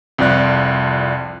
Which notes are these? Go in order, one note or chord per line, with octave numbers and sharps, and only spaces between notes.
C2 F2 F4 D5 F#6